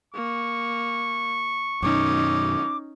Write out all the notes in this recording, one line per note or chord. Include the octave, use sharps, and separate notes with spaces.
A#3 C#6
F#2 B2 D#3 C#4 D#4 D6